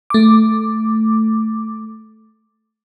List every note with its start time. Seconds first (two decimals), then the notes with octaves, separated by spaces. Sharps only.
0.10 A3 D6